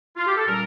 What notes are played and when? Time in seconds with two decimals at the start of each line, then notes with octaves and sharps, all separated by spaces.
0.17 F4
0.27 G4
0.36 A4
0.47 A#2 G3 C#4 F4 A#4